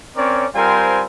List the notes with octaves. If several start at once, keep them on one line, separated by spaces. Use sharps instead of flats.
C4 C#4 A#4 C#5 D5
G3 C4 F4 A#4 C5 G#5